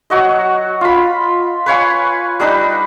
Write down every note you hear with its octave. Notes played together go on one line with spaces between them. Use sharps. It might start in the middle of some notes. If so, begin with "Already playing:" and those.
F#3 F#4 D#5
F4 B5
B4 C#5 F5 G#5
G3 D4 D#4 B4